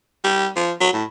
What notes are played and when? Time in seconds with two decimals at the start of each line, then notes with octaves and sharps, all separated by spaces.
0.24 G3
0.56 F3
0.80 F#3
0.93 A2